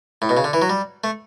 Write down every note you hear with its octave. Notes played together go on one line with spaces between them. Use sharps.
A2
B2
C#3
D3
E3
F#3
G3
A3